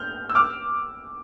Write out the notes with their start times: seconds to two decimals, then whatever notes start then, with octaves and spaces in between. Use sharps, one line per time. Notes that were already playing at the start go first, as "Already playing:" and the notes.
Already playing: F6 G6
0.29 E6
0.35 D6 F6